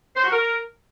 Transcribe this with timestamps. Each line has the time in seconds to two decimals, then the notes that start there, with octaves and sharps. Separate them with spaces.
0.16 C5
0.24 F#4
0.31 A#4